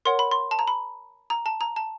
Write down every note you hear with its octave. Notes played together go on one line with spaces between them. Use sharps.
A#4 C#5 F#5 C6
B5
C6
A5
A#5
B5
A#5
A5
A#5
A5